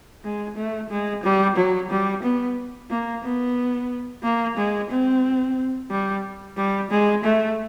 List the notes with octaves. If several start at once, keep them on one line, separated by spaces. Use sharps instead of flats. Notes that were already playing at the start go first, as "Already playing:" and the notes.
G#3
A3
G#3
G3
F#3
G3
B3
A#3
B3
A#3
G#3
C4
G3
G3
G#3
A3